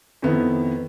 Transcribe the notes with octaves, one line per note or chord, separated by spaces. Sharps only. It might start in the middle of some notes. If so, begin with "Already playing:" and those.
F2 D#3 B3 E4